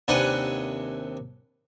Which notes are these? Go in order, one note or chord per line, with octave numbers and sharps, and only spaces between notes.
D#2 C3 D4 B4 F#5 G#5